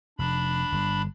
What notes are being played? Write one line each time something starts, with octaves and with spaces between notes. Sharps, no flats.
F1 D4 B5
G1